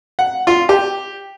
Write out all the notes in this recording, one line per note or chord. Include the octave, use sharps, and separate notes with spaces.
F#5
F4
G4